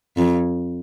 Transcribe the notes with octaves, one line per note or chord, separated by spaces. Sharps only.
F2